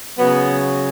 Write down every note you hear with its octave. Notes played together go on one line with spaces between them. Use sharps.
C#3 F#3 B3